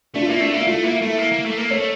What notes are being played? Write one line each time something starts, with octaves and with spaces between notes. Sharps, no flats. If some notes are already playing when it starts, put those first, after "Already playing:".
A3 D4
F4
A#3 E4
A3 D4
A#3 E4
A3 F4
A#3 E4
A3 E4
A#3
A#3
A3
A#3
A3 C#5